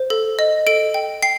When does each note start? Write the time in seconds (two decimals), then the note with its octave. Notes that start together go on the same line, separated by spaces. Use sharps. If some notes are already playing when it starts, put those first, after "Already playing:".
Already playing: C5
0.10 A4
0.39 D#5
0.67 A4 D7
0.94 G5
1.22 G5 C7